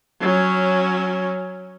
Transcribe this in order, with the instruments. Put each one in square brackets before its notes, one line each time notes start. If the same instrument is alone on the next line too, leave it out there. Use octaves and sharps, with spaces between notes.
[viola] F#3 C#4